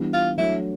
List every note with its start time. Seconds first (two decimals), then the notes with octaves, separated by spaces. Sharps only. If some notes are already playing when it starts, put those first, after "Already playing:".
Already playing: E3 G3 B3 D4
0.13 F4
0.38 F#3 A3 D4 E4